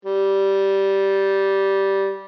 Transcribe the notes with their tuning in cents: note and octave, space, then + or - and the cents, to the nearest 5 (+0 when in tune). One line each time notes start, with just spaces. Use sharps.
G3 -10